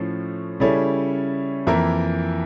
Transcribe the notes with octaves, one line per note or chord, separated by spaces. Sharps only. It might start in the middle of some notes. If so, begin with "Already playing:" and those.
Already playing: A2 F3 C#4
C#3 G3 C#4 E4 A4
F2 E3 A#3 E4 A#4